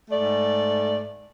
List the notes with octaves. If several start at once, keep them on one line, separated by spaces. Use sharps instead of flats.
G#2 A3 D5